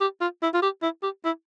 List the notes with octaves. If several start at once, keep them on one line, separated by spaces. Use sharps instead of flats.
G4
F4
E4
F4
G4
E4
G4
E4